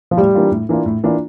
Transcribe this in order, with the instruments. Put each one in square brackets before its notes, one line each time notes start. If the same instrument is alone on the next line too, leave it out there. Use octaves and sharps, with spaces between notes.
[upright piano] F3
[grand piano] A2 [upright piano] G3
[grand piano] E3 A#3 D4 F4
A2
E3 A#3 D4 F4
A2
E3 A#3 D4 F4